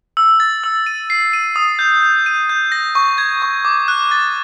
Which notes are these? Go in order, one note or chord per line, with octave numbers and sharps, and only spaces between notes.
E6
A6
E6
D#7
C7
D#7
D#6
G6
G6
D#7
G6
A#6
C#6
G#6
C#6
D6
F#6
A6